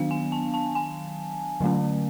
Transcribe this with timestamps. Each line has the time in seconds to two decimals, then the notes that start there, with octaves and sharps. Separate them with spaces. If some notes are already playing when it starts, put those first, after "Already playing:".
Already playing: D#3 F#3 B3 D4 F5
0.11 G#5
0.32 A5
0.54 A5
0.75 G#5
1.60 D3 F#3 A3 C#4